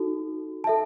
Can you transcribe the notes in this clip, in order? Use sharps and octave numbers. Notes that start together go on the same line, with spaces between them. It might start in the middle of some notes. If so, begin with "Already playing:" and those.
Already playing: D#4 F#4 A4
A4 E5 A5